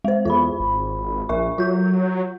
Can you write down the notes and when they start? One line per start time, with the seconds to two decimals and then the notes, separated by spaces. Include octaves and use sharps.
0.05 G#3 C5
0.25 E2 F4 C5 B5
0.60 G#1
1.29 A#1 A#4 E5 C#6
1.58 F#3 F4 G6